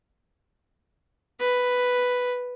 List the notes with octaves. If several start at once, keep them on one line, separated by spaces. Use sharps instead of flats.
B4